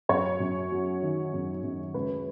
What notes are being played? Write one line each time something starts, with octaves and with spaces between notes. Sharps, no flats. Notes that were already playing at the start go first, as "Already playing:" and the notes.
F#2 C#5
F#2
F#3
D#3
F#2
F#2
C#2 B4